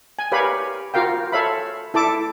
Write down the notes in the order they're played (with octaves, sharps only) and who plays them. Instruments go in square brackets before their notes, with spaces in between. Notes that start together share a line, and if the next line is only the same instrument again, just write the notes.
[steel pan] G#5
G4 A#4 B4 C#5 F5 B5
F4 F#4 A#4 F5 G5
A4 C#5 E5 F5 B5
E4 A4 A5 D6